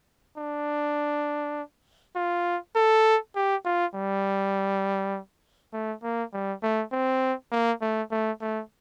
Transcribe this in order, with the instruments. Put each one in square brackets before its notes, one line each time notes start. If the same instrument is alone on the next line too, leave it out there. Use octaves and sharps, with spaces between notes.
[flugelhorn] D4
F4
A4
G4
F4
G3
A3
A#3
G3
A3
C4
A#3
A3
A3
A3